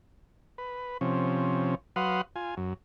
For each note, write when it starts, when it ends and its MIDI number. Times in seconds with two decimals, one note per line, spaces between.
0.58 0.97 71
1.01 1.75 48
1.01 1.75 53
1.01 1.75 61
1.96 2.21 54
1.96 2.21 71
1.96 2.21 77
1.96 2.21 78
1.96 2.21 84
1.96 2.21 87
2.36 2.55 65
2.36 2.55 80
2.57 2.74 42